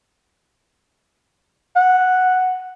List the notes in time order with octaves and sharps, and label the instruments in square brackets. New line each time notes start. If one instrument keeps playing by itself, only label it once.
[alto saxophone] F#5